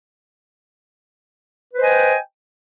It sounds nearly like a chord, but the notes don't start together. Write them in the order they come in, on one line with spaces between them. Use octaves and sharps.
B4 C5 D#5 G#5 G5